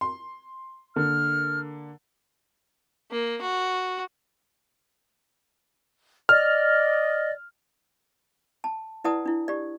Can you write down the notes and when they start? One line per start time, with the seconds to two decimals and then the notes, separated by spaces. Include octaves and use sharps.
0.01 C6
0.96 D3 A#3 F6
3.11 A#3
3.42 F#4
6.29 D5 D#5 F6
8.64 A5
9.04 E4 B4 D5 F#5 A5 D#6
9.26 D4 E4
9.48 G4 D5